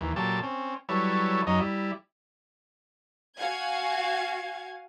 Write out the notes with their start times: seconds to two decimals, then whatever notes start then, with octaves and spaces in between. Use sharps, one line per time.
0.01 D#2 E3
0.16 A#2 F#3 G4 A4 A5
0.43 C4 C#4
0.89 F#3 G3 E4 A4 B4 C#5
1.47 F#2 F#3 D#4 D#5
1.60 G3 E4
3.36 F#4 F5 F#5 G#5 G#6